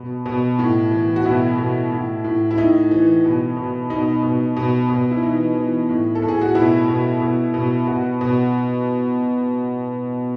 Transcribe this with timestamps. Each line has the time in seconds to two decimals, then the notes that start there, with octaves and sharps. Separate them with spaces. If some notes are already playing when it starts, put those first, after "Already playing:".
Already playing: B2
0.26 B2
0.59 A2
0.91 E3
1.16 F#4
1.25 B2 E4
1.58 B2
1.92 A2
2.24 A2
2.51 E4
2.57 A2 D#4
2.91 E3
3.24 B2
3.57 B2
3.90 B2 D#4
4.23 B2
4.57 B2
4.89 B2
5.11 E4
5.22 E3 D#4
5.55 E3
5.89 A2
6.15 A4
6.22 A2
6.28 G#4
6.41 F#4
6.55 B2 E4
6.88 B2
7.22 B2
7.54 B2
7.87 B2 F#4
8.21 B2